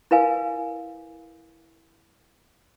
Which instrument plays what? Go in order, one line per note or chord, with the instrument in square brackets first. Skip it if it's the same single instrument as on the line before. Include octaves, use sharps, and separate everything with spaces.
[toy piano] E4 A#4 B4 F5 G#5